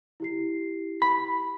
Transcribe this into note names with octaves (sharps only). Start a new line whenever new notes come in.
E4 G4 C7
B5